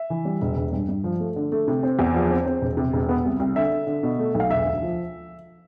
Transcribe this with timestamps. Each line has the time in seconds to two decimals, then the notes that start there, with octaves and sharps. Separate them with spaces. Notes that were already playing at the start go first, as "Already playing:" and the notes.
Already playing: E5
0.10 E3
0.25 G3
0.41 E1
0.57 E1
0.72 G2
0.89 G2
1.04 F3
1.20 A3
1.36 D3
1.52 A3
1.68 C3
1.83 C4
1.99 E2
2.14 F3
2.30 C4
2.46 C4
2.61 E1
2.77 C3
2.93 E1
3.09 B3
3.25 C2
3.40 C2
3.56 D3 E5
3.72 D3
3.87 D3
4.03 B2
4.19 A3
4.34 B1
4.40 F5
4.50 E1 E5
4.66 D2
4.82 F3